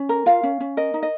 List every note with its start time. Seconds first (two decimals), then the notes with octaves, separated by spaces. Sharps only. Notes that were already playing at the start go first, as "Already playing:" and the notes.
Already playing: C#4
0.09 A#4
0.26 F4 F5
0.43 C#4
0.60 C#4
0.77 A#4 D#5
0.94 D#4
1.03 D#5